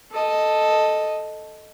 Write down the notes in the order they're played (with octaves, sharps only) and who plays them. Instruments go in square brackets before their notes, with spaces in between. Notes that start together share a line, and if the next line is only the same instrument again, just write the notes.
[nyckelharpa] A4 D#5